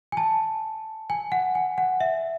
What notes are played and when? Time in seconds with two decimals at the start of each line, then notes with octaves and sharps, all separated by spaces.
0.12 G#5
0.17 A5
1.10 G#5
1.32 F#5
1.55 G#5
1.78 F#5
2.01 E5